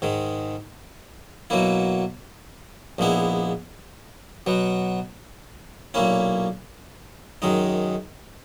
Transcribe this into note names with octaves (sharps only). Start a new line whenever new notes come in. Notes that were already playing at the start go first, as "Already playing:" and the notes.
G#2 D#3 G#3
B2 F#3 A#3 E4
A#1 A#2 G#3 B3 E4
B2 F#3 B3
B1 A#2 A#3 C#4 E4
F#2 D#3 G#3 D#4